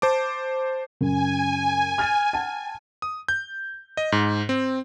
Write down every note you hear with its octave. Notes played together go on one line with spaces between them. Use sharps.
C5 A5 D6
F#2 C#3 G#5
F6 A6 D#7
F#5 G5 A5
D#6
G6
D#5
G#2
C4